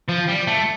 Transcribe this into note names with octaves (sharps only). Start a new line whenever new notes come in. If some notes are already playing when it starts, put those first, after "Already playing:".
F3
G3
A3